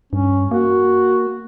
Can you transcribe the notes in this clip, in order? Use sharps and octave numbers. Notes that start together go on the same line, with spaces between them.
G2 C#4
A#3 F#4